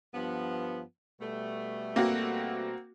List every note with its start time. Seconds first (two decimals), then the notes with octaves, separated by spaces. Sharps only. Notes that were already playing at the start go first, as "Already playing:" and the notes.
0.14 G2 F3 B3
1.21 B2 G3 A3
1.96 A#3 C4 F#4